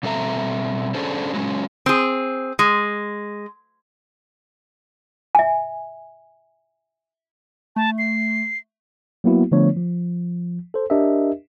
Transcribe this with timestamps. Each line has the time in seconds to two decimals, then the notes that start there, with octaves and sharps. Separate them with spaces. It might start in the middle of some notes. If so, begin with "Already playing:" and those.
0.03 B2 G3 C4 A4 E5 A#5
0.94 C#4 D4 G#4 A4 C5
1.34 F#3 G#3 C4 C#4
1.86 C4 G#4
2.59 G#3
5.35 E5 G#5
7.76 A3 A5
7.98 C7
9.24 F#3 A#3 B3 E4 F#4
9.52 D3 F3 A3 B3 D4 C#5
9.76 F3
10.74 A4 C5
10.90 D4 G4 A#4 D#5 E5